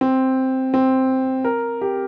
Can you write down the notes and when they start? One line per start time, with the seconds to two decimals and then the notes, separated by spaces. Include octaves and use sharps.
0.01 C4
0.74 C4
1.45 A#4
1.81 G4